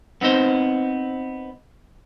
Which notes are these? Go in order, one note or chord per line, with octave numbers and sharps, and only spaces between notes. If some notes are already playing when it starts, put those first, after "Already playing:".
B3 C4 D#4 C5